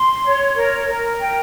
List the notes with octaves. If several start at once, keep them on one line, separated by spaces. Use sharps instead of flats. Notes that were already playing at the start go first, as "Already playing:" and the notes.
Already playing: C6
C#5
A#4
A#4
G5